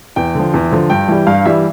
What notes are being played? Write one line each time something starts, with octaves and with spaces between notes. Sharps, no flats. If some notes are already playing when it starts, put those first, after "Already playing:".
E2 G5
D3 F3
E2
D3 F3
G2 G5
E3 G3
G2 F5
E3 G3 E5